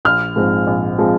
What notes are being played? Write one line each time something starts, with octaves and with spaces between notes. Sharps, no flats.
A#1 F6
G#2 F3 G#3 C4
A#1
F3 G#3 C4